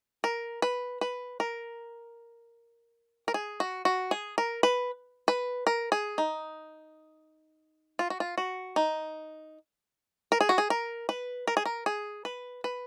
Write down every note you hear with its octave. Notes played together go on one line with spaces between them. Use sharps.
A#4
B4
B4
A#4
A#4
G#4
F#4
F#4
G#4
A#4
B4
B4
A#4
G#4
D#4
F4
F#4
F4
F#4
D#4
A#4
G#4
F#4
G#4
A#4
B4
A#4
G#4
A#4
G#4
B4
B4